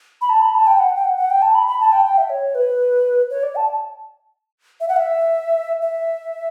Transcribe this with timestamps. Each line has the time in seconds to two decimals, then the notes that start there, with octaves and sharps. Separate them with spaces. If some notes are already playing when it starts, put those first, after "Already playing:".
0.21 B5
0.30 A5
0.42 B5
0.55 A5
0.67 G5
0.80 F#5
0.96 G5
1.05 F#5
1.17 F#5
1.30 G5
1.42 A5
1.55 B5
1.67 B5
1.80 A5
1.92 G5
2.05 G5
2.18 E5
2.30 C#5
2.55 B4
3.30 C#5
3.43 D5
3.56 A5
4.80 E5
4.89 F#5
4.97 E5
5.82 E5